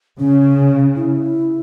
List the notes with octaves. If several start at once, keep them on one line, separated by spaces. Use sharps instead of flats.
C#3 C#4
E4